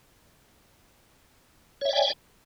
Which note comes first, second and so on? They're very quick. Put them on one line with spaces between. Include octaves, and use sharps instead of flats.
C#5 E5 D5 G5 G#5